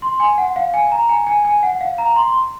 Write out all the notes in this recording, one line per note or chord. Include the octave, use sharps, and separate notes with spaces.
C6
G#5
F#5
F5
G#5
A#5
G#5
G#5
G#5
F#5
F5
A#5
C6